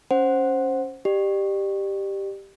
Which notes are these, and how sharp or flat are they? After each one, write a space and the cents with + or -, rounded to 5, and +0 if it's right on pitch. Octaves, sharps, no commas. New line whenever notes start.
C#4 +0 C5 +10 F#5 +0
G4 +0 D5 +35